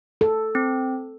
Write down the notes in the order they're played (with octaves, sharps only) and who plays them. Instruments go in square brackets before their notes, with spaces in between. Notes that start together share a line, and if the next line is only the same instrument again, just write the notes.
[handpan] A4
[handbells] C4